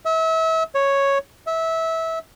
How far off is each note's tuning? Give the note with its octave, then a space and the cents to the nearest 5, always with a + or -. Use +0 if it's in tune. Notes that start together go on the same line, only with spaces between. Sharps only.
E5 -35
C#5 -5
E5 -20